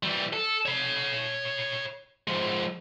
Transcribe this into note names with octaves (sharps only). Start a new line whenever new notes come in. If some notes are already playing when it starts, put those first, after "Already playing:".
E3 G3
A4
C#5 B5
F3 G#3